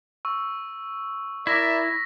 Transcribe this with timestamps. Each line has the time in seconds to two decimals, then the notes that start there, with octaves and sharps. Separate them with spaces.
0.25 C#6 E6
1.47 E4 A#4 D5 E5 A#6 B6